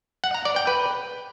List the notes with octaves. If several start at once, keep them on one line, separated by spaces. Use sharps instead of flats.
F#5
A#5
D5
G5
B4